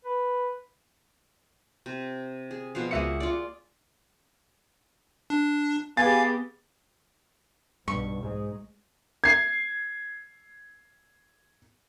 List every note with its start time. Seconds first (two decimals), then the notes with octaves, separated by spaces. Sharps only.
0.05 B4
1.86 C3
2.51 G#4
2.75 B2 F3 F5
2.91 C#2 A#3 F#4 G#4 E5 C#7
3.20 F4 D5
5.30 D4
5.97 B3 G4 G#4 F5 G#5 A6
7.88 B1 G2 B2 C#6
8.23 G#2 G#3
9.24 G#6 C7